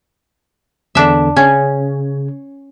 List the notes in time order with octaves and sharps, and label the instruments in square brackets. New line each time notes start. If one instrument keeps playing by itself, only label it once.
[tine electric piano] E2 D3 [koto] D4 E5
[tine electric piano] C#3 [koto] C#4